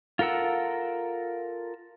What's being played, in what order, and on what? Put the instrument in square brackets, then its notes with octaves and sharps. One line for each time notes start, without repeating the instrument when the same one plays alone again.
[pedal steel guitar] F4 A4 A#4 F#5 E6